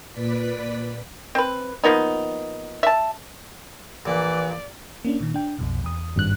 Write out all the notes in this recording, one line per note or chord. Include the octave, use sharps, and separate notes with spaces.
A#2 B4 D5 B6
C4 B4
F3 A#3 B3 D#4
E5 A5
A#1 A#2 E3 D5
A#3 C#4 D4
A#2 D#3
D4 G5
B1 F2 B2
E2 D#6
G#1 G2 F#6